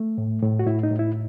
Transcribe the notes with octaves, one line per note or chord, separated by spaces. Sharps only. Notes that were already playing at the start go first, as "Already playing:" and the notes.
Already playing: A3
A2
A2
F#4
A2 E4
D#4
A2
E4